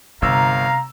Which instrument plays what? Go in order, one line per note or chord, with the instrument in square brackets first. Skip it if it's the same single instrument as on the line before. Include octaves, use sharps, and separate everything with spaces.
[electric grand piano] G1 E6 [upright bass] C3 [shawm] F5 [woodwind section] A#5